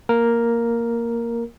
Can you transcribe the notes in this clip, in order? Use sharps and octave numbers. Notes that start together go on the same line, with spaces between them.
A#3 A#4